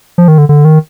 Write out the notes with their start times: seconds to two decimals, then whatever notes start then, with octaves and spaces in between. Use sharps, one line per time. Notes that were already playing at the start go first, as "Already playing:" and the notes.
0.18 F3
0.28 D#3
0.38 D3
0.49 D3
0.65 D#3